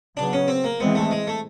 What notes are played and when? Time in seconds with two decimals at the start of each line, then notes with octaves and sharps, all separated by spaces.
0.17 C#3 F#3 B3 D4
0.33 C#4
0.48 C4
0.64 A#3
0.80 E3 G#3 B3 C4
0.95 A3
1.11 G#3
1.27 A3